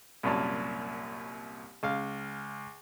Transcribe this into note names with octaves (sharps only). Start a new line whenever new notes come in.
C2 F#2 A#2 C#5 A5
C#2 F5